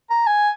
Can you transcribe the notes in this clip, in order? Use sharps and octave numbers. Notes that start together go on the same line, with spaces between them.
A#5
G#5